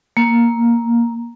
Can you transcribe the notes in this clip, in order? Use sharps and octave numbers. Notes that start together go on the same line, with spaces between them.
A#3